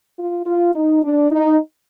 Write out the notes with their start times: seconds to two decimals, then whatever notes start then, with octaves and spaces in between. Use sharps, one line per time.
0.18 F4
0.46 F4
0.75 D#4
1.04 D4
1.32 D#4